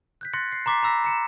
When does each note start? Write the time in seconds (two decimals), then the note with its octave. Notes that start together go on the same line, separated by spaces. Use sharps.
0.21 F#6 G6 B6
0.33 C6 F#6 A6 A#6 C7 C#7
0.52 C7
0.66 A#5 C6 D6 A6 B6 C7
0.83 A#5 B5 E6 A#6 B6
1.04 A#5 C#7 E7